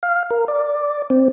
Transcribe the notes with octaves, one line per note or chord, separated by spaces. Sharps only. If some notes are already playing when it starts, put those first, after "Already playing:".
F5
A#4
D5
C4